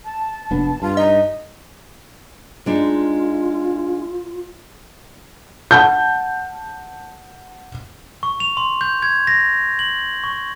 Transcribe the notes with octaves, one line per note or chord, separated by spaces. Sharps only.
A5
F1 B3 D4
G2 F4
D#4 D#5
G#3 D4 D#4 F4
F#5 A5 G6
C#6
F7
C6
G6
G#6
A#6
F#7
C#6